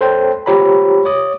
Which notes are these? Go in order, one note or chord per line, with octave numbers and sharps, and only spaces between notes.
A4 C5 C#5 G5
F4 G4 C5 C#5 A#5 B5
C#5 D6 D#6